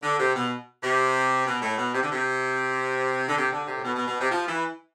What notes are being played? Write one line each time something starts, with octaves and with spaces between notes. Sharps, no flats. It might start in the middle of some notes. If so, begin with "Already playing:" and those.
D3
C3
B2
C3
B2
A2
B2
C3
D3
C3
D3
C3
D3
C3
A2
B2
B2
B2
C3
F3
E3